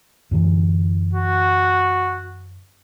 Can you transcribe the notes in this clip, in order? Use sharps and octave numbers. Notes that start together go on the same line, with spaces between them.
F#2 D3 E3
F#4